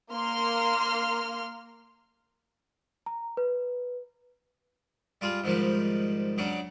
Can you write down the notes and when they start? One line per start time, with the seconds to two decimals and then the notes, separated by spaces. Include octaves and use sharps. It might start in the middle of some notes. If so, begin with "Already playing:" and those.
0.11 A#3 C6 F6
3.06 A#5
3.37 B4
5.21 G3 F4 G#4
5.44 G#2 D#3 F3 G3
6.38 C#3 F#3 D4